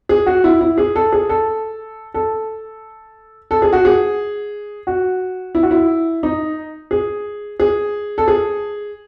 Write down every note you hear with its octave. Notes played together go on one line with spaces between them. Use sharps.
G#4
F#4
E4
E4
G#4
A4
G#4
A4
A4
A4
G#4
F#4
G#4
F#4
E4
F#4
E4
D#4
G#4
G#4
A4
G#4